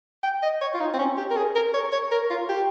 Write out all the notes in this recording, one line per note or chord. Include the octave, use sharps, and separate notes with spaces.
G5
D#5
C#5
F4
D#4
C4
C#4
G4
A#4
G#4
A#4
C#5
C#5
A#4
F4
G4